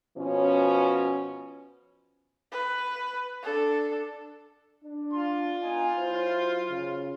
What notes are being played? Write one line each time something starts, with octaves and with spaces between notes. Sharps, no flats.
B2 F3 C#4
B4
D4 A4
D4
F4 C6
B3 D#4 G#5
F#3 E4 C5
F#2 C#3